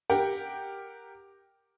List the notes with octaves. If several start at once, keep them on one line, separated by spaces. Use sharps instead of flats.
G4 A#4 F#5 G5